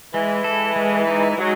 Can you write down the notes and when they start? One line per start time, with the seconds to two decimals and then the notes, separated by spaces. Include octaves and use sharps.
0.14 E3 G#3
0.44 A4
0.76 G#3
1.07 D#4
1.29 E3
1.38 F#3 G#3